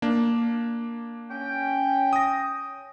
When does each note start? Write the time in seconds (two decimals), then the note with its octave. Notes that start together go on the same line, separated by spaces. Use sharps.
0.02 A#3 D4
1.31 C#4 G5
2.13 D#6 A#6